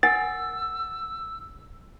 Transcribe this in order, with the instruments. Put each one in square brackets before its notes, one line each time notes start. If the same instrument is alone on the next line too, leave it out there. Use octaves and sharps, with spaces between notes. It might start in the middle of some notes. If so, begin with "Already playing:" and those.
[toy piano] A#4 F#5 G#5 [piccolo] E6 [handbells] A6